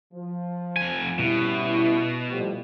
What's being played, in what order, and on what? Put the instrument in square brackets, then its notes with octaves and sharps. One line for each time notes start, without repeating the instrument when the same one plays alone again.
[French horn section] F3
[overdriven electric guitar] F2 G#5
[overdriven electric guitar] B2 [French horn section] G3 C#4 E4
[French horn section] A2 F3 G3